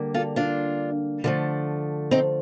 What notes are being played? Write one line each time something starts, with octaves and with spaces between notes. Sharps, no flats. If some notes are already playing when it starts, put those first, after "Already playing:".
Already playing: D3 G3 A#3
F4 A4
D4 F4
D3 F3 A3
C4 D#4